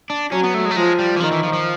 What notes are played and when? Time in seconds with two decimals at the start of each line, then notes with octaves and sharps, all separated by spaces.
0.10 D4
0.32 F#3 C#4
0.43 B3
0.54 A3
0.65 G#3
0.71 A3
0.76 F3 G#3
0.99 G3
1.16 E3
1.20 D#3 F3
1.32 E3
1.43 F3
1.53 F3